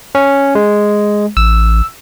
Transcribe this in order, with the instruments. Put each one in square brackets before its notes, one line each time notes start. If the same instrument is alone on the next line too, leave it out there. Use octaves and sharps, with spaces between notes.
[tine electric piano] C#4
G#3
[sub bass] A1 [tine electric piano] E6